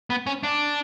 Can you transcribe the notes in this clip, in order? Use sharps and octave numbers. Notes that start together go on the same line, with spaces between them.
B3
C#4
D4